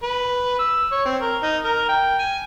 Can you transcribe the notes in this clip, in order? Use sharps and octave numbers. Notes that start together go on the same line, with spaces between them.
B4
E6
C#5
C4
A#4
D#4
A#4
G5
G#5